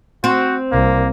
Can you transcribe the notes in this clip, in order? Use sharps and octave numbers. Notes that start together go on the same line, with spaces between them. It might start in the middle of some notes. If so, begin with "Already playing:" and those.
C4 F#4
C2 A#3